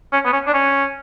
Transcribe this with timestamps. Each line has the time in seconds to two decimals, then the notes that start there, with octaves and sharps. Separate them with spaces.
0.13 C#4
0.25 B3
0.33 C#4
0.47 D4
0.54 C#4